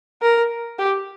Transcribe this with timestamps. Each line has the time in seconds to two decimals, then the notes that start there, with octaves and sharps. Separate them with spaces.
0.22 A#4
0.79 G4